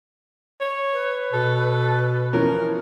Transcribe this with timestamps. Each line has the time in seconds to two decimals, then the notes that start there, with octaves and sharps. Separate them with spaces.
0.61 C#5
0.93 B4
1.33 B2 A4
2.33 E3 F3 C#4 A#4